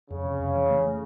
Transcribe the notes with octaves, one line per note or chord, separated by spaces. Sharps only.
F2 C#3
C3
F2
E3
A3
A3